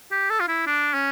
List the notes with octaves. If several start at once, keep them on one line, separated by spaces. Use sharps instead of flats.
G4
A4
F4
E4
D4
C#4